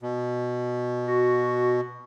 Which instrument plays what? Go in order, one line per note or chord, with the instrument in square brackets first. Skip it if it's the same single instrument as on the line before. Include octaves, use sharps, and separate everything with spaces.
[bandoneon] B2
[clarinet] F#4